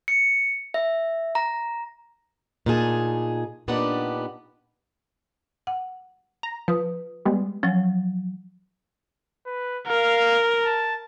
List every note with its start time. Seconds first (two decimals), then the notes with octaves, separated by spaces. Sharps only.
0.08 C#7
0.74 E5
1.35 A#5
2.66 A#2 D#4 G#4 A5
3.68 A#2 B3 D4 D#4 G4 F#5
5.67 F#5
6.43 A#5
6.68 F3 B4 D#6
7.25 G3 G#3 B3
7.63 F3 F#3 C#4
9.47 B4
9.87 A#4 F5
10.65 A5